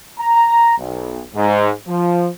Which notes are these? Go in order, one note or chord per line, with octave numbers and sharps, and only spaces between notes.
A#5
B1
G#2
F3